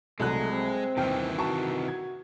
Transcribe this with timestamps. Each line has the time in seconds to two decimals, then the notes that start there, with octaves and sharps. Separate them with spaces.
0.20 C2 F#3 G#3 A3 F#6
0.52 C4
0.97 D#1 C3 D#3 E3 G5 F6
1.39 F#4 A5 A#5 C#6
1.88 G#6